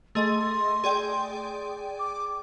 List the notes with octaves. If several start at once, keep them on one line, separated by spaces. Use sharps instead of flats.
A3 G#4 D#5 C6
G#4 D5 G5
D6